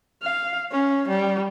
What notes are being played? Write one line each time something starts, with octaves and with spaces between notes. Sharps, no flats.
F5
C#4
G3